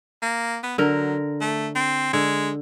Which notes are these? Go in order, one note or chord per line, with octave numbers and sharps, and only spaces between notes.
A#3
B3
D3 F#3 A#4
A3
C4
D3 G#3